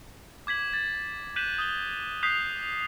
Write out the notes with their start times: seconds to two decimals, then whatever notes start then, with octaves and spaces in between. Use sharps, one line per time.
0.47 D6 G#6 B6 F#7
0.73 A6
1.36 F#6 G6 B6 D#7 E7 F#7
1.58 D#6 G7
2.23 D#6 F#6 G6 B6 C7 F7